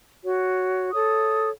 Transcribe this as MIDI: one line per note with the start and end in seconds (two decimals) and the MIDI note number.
0.25 0.89 66
0.25 0.89 73
0.92 1.50 69
0.92 1.50 73
0.92 1.50 87